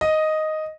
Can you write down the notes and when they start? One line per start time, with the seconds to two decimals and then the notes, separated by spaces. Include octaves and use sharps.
0.01 D#5